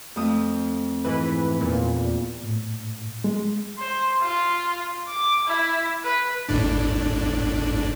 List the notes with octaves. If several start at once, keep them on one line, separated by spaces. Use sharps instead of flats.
F2 A3 D#6
G#2 E3 B4
E2 A#2
A2
G#3
C5
F4
D6
E4
B4
G#1 A2 D4